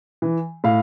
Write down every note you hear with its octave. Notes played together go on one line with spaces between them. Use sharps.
E3
A2 F5